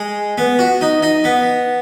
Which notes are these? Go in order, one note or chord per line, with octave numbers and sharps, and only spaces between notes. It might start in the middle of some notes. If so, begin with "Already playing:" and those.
Already playing: G#3
B3
F#4
D#4
D#4
B3